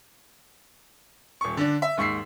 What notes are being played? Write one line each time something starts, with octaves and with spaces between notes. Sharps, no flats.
D#1 C#6
D3 D4
E5
D#2 G#2 C#6 E6 B6 C7